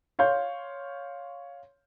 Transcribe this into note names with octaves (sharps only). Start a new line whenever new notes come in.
C#5 F5 C6 G6